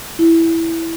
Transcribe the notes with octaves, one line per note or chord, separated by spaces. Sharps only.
E4